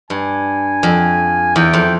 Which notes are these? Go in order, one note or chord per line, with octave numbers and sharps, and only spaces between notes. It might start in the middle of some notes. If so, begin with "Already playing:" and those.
G2 G#5
F2
E2 G5
F2